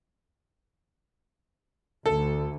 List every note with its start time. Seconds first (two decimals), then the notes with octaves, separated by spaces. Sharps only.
2.06 D2 A4